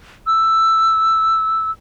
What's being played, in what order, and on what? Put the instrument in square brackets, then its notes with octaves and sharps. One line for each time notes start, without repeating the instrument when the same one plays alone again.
[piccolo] E6